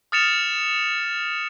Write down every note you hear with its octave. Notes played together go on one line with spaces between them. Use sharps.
D#6 F6 A6 C#7 E7 F7